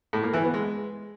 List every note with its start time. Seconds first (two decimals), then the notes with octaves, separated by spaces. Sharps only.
0.13 A2
0.23 A#3
0.33 E3
0.44 B3
0.54 G#3